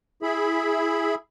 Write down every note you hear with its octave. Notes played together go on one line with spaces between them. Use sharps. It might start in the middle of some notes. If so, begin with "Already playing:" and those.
E4 G#4 E5 B5